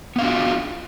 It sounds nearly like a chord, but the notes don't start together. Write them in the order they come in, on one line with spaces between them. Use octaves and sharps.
B3 F5 D4 F#4 F4